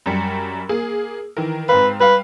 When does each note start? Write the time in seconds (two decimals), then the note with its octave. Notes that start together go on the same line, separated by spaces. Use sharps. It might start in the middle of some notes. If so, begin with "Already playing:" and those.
0.06 F#2 G3 C#7
0.69 A#3 G#4
1.37 D#3 E3 A#4
1.69 G#2 C4 B4 F5
2.00 G3 B4 F5